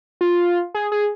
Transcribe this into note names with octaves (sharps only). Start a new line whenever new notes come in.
F4
G#4
G#4